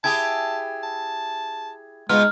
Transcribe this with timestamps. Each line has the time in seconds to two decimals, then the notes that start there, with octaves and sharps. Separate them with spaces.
0.04 E4 G4 G#4 A5 G#6
0.83 A5
2.09 B2 G#3 B3 D#4 F4 F6